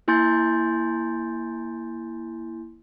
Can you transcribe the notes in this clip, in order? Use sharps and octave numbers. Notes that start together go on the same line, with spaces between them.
A#3 E4 G#5 C6 G6 A6